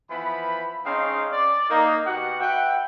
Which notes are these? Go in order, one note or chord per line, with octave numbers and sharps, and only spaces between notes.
E3 F3 B3 B5
G#3 C4 C#4 D#4 F5 C6
D5
A#3 D#4
B2 B3 F#4 G4 F#5
B4 E5 F#5 G5